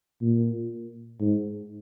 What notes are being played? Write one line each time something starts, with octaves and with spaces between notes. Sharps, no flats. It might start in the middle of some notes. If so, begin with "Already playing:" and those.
A#2
G#2